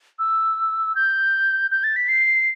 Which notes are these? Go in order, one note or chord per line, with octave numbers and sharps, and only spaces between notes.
E6
G6
G6
A6
B6
C7